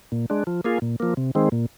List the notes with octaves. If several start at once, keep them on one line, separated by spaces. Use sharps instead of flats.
A#2
G#3 D4
F3
A#3 F4 G#4
A#2
F3 A#3
C3
D#3 G#3 C4
A#2